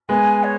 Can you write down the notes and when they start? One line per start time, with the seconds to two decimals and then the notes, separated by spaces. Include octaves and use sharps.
0.09 G#3 B3 G#5
0.43 C#5